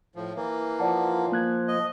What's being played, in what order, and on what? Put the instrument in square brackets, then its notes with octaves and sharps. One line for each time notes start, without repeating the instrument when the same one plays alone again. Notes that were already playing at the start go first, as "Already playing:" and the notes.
[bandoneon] A2 F3
E3 A#3
[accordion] F3 [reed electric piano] D5 F#5 A5
[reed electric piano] A#3 F#6 G#6
[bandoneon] D#5